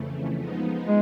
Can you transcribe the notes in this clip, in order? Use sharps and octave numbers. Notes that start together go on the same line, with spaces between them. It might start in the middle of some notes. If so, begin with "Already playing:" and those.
Already playing: F2 C#3 E3 A3
F3 G#3 B3 D#4
G#3